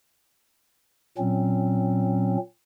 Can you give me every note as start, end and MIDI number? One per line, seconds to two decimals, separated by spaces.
1.18 2.37 46
1.18 2.37 54
1.18 2.37 60
1.18 2.37 61